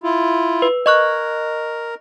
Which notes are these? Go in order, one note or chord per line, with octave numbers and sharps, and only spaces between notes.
E4 F4
B4
A#4 D#5 C#6 F#6